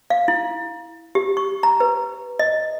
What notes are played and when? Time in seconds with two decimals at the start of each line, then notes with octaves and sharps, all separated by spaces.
0.10 F5
0.28 E4
1.15 G4
1.37 C#6
1.63 A#5
1.80 B4
2.39 D#5